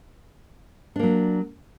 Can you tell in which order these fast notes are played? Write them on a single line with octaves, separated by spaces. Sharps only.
D4 A#3 F#3